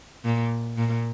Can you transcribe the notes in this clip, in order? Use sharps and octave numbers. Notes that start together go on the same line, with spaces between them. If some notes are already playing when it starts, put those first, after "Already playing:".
A#2
A#2